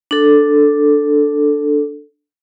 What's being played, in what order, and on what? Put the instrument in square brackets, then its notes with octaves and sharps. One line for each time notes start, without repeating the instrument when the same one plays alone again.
[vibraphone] D4 A4